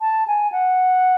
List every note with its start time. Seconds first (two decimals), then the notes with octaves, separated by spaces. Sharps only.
0.01 A5
0.28 G#5
0.52 F#5